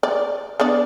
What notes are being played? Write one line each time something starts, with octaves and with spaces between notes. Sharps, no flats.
D5
B3 D4 D5